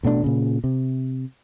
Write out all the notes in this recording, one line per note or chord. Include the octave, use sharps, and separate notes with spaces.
A1 B2 A3 D4
A#2 C#3
C3